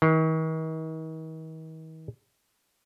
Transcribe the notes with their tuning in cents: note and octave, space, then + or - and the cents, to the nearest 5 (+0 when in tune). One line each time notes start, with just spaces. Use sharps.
D#3 +45